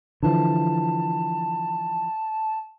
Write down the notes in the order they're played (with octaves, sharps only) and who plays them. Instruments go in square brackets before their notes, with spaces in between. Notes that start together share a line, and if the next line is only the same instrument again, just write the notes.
[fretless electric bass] D3 E3 F3 [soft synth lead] A5